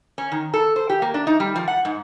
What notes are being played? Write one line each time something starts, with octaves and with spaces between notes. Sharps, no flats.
C#4
D#3
A4
C5
G4
A#3
D4
D#4
G3
F3
F#5
G#2